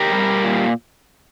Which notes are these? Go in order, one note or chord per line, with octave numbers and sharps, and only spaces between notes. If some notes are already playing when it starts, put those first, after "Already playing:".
Already playing: G4 A#4
G3
A#2